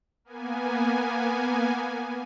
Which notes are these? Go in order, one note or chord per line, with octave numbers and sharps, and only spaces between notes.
A#3 B3 G#5